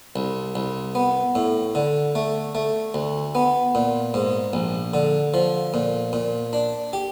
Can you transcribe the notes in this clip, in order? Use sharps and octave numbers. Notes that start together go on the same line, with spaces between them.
C2
C2
B3
A2
D3
A3
A3
D2
B3
A#2
G#2
A#1
D3
F3
A#2
A#2
D4
G4